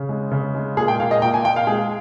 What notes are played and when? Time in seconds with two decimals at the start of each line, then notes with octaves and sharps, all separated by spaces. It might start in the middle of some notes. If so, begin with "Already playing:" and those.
Already playing: C#3
0.09 G#3
0.32 C#3
0.55 G#3
0.77 A#2 G#4
0.88 G5
1.00 A#2 F5
1.11 D#5
1.22 A#2 G5
1.34 G#5
1.45 A#2 G5
1.56 F5
1.67 G#3 G#4